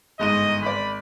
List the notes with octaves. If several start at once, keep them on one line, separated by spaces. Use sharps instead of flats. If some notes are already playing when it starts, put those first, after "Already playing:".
G1 G#2 D#5 D#7
G#1 D5 B5